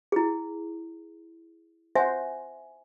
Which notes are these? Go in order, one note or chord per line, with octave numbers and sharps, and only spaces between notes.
E4 G#4
C5 E5 F#5 G#5